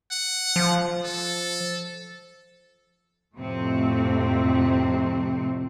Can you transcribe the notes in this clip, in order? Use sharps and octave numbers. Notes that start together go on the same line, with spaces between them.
F#5
F3
A4
F2 A2 C3 A3 C4